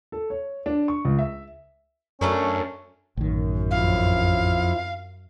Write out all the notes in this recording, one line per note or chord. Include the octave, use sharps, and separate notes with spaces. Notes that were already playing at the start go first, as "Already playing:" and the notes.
A4
C#5
D4
C#6
C#2
E5
F#2 A3 C#4 D4 A#4
A1 F#2 D#3
F2 F3 E4 F5